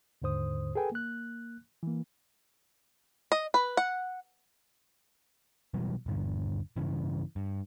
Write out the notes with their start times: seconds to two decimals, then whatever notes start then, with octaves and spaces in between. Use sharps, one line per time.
0.22 D#2 G#2 D3 C5 D#6
0.75 G#4 A4 B4 G5 G#5
0.92 A#3 F#6
1.83 E3 A#3
3.32 D#5
3.54 B4
3.77 F#5
5.74 B2 E3 F#3 G3
6.06 D#1 G2 D3
6.76 G2 C#3 E3
7.36 G2